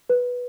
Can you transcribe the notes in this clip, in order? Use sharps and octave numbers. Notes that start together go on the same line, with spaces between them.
B4